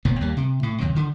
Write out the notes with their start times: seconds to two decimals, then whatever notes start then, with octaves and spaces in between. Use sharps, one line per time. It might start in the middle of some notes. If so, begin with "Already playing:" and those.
0.05 F1 A#2 B3
0.21 D#2 G3 A#3
0.37 C3
0.63 A2
0.80 D#2 C3 D#3 F#3
0.95 D3 D#3